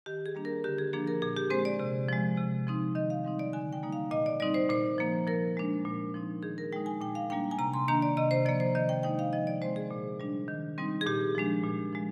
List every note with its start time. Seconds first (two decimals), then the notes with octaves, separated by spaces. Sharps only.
0.06 D#3 G4
0.26 G#4
0.35 G3 A#3 D4
0.45 A#4
0.64 D3 G4
0.78 G#4
0.93 F3 A#3 D4 G#4
1.07 A#4
1.22 A#2 G#4
1.37 G4
1.50 G#3 C4 C5
1.65 D5
1.79 C3
2.09 F3 G#3
2.37 C3
2.67 F3 C4 D#4
2.95 D#3 D#5
3.10 F5
3.25 G3 C4 D#4
3.39 D5
3.53 D3 G#5
3.73 G5
3.83 G3 A#3 D#4
3.93 F5
4.11 A#2 D#5
4.26 D5
4.40 G3 C4 D#4 D5
4.54 C5
4.70 A#2 C5
4.98 F3 A#3
5.27 F3 A#4
5.57 G#3 D4
5.85 A#2
6.14 F3 C4 D#4
6.43 D#3 G#4
6.58 A#4
6.72 G#3 D#4 G5
6.86 G#5
7.01 A#2 G5
7.15 F5
7.30 G3 A#3 D4 G5
7.51 G#5
7.58 C3 A#5
7.74 C6
7.88 D#3 A#3 D4 A#5
8.02 D5
8.17 C3 D#5
8.31 C5
8.46 F3 A#3 D5
8.60 C5
8.75 D#3 D#5
8.89 G5
9.03 G#3 D#4 G5
9.19 F5
9.33 F3 D#5
9.47 D5
9.61 G#3 C4 C5
9.76 G#4
9.90 A#2
10.20 G3 D4
10.48 D#3
10.78 G3 C4 D#4
11.01 G#4
11.07 A#2 G4
11.35 F3 G#3 D4
11.64 A#2
11.93 F3 G#3